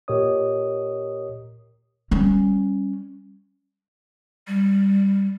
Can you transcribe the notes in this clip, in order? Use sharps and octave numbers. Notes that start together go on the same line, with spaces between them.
A#2 G4 A#4 C#5 D#5 D#6
G3 C#4
G3